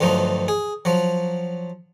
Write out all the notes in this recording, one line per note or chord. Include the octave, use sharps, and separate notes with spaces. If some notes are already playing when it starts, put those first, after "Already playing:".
D2 G2 F3 F#3 D#4
G#4
F3 F#3